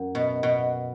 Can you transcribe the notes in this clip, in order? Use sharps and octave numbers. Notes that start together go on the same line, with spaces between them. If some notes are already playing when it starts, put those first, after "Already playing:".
Already playing: F#2
B2
B2